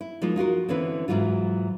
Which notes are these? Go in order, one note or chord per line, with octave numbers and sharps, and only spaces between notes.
E4
F3 G#3 A#3 D#4 F4
D#4 F4 F#4 A#4
D3 E3 C4 C#4 E4 B4
G#2 C3 E3 F#3 F4